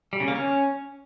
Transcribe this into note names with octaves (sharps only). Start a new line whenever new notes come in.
G3
C#3
A#3
C#4